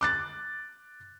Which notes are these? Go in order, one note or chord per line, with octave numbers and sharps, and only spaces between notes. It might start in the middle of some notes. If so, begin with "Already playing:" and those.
D6 F#6 A6